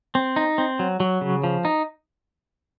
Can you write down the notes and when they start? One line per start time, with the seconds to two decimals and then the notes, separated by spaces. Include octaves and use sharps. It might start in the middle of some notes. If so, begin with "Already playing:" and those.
0.15 C4
0.36 D#4
0.58 C4
0.79 F#3
1.00 F#3
1.21 C#3
1.44 F3
1.65 D#4